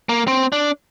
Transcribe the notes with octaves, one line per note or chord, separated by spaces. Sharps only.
A#3
C4
D4